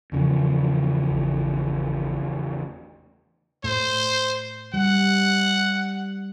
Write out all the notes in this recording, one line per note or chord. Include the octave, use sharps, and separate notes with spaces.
E2 C#3 F3
G#1
A2 C5
G3 F#5